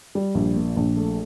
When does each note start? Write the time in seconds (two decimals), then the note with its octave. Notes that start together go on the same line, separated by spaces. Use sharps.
0.15 G3
0.35 A#1
0.56 A#2
0.77 A#1
0.97 A3